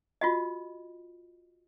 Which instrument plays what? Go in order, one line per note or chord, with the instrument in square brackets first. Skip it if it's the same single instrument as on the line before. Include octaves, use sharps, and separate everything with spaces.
[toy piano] F4 F#4 D#5